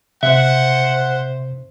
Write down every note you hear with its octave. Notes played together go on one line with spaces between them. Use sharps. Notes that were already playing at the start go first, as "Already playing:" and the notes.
C3 C5 E5 F#5